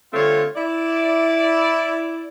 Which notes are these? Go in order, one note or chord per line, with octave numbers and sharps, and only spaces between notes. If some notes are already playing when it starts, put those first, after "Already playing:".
D3 G3 A3 C4 F4 C#5
E4 D5